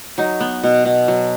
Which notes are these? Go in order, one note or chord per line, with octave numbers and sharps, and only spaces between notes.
F#3 D#4
B3
B2
B2
F#3